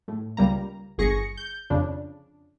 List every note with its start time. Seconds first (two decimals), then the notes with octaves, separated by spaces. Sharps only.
0.08 A2
0.37 C#2 G3 A#3 A#5
0.98 G1 G#4 C#6 A#6 C#7
1.37 G6
1.70 F2 C#3 D4